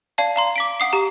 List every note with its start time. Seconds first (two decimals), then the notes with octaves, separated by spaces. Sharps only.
0.18 D5 F5 A5
0.36 F5 A#5 C6
0.56 D6 B6 D7
0.80 F#5 D#6 C7
0.93 G4 A#5